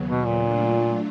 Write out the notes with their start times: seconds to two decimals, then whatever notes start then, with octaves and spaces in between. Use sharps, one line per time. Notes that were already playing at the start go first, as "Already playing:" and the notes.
Already playing: D#2 C#3 F#3 B3
0.10 B2
0.25 A#2
0.41 F#3 A3 D4 F4